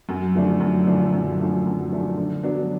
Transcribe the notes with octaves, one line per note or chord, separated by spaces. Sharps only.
F#2
D3 F3 A3 D4
F#2
D3 F3 A3 D4
F#2
D3 F3 A3 D4
F#2
D3 F3 A3 D4
D3
F#3 B3 D4